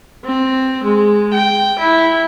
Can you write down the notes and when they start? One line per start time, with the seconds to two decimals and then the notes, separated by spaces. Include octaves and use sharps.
0.25 C4
0.84 G#3
1.34 G5
1.79 E4